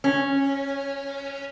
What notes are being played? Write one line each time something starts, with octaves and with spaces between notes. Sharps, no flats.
C#4